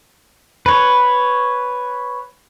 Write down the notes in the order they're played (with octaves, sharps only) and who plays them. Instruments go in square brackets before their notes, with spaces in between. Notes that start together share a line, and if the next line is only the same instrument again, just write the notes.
[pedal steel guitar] B4 C#5